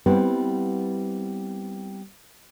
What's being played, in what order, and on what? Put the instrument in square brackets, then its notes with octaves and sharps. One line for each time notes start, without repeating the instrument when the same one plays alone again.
[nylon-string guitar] G3 B3 C4 E4